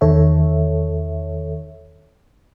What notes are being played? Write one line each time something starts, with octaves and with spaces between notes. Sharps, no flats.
E2 D#3 A4 C#5 E5